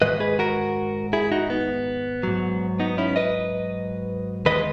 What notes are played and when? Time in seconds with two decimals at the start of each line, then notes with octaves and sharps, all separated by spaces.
0.02 G#2 D#3 G#3 B4 D#5
0.20 G#4 B4
0.39 F#4 A#4
1.13 E4 G#4
1.32 D#4 F#4
1.50 B3
2.23 G#2 F#3
2.80 B3 D#4
2.98 C#4 E4
3.16 B4 D#5
4.46 D#2 D#3 G#3 B4 D#5